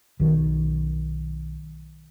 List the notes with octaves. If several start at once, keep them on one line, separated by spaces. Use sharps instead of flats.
B1 D#3